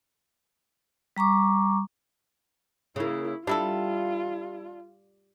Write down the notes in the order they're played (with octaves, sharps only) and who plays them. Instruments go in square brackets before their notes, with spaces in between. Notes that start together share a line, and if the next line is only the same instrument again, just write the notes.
[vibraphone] G3 A#5 C#6 D6
[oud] C#3 A#3 [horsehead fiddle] E4
[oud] G3 [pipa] D4 E4 A4 [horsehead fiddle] F4